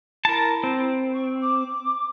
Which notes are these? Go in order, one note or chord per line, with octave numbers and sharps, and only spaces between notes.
E4 A#4 A5
C4
C#6
D6